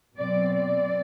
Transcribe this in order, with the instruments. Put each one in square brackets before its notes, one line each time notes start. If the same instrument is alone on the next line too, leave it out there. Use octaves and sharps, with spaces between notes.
[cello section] B2 F#3 C4 D5
D5